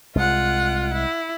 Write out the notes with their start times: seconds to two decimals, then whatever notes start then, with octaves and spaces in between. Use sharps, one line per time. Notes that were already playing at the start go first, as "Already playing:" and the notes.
0.15 C2 G#3 F4 F#5
0.94 E4